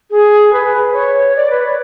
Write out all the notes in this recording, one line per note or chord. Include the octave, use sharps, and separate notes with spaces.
G#4
B4
C#5
D5
B4
C#5